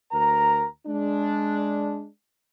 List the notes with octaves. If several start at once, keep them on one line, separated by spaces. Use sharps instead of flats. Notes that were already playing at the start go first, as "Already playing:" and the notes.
D2 A#4 A#5
G#3 D4